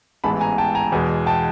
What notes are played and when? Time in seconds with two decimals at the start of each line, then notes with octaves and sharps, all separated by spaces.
0.24 A1 G#2 E3 G#3 B3 A5 B5
0.41 G#5 A#5
0.58 G5 A5
0.75 G#5 A#5
0.92 E2 B2 G#3
1.26 G5 A5